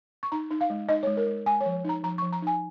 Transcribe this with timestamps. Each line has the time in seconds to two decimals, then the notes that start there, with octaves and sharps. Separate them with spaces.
0.23 C#6
0.32 D#4 A#5
0.50 D#4
0.61 F5
0.70 G#3
0.89 D#4 D#5
1.03 G#3 C#5
1.17 A#4
1.27 G#3
1.46 G#3 G#5
1.61 C#5
1.66 F3
1.84 D#4 A#5
2.03 F3 A#5
2.18 F3 C#6
2.33 A#5
2.42 D#4 G#5